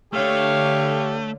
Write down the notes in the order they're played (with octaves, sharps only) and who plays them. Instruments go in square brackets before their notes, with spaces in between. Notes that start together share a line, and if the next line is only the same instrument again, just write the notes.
[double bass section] D3 [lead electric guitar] A3 [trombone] G4 [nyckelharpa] C#5 F5